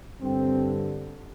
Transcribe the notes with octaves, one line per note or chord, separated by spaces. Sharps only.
G2 D3 C4